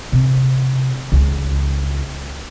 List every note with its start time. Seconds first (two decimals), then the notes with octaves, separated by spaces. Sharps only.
0.12 C3
1.12 C#2